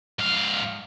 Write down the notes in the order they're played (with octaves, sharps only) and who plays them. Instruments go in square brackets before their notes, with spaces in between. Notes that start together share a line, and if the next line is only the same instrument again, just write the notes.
[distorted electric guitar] G#2 F5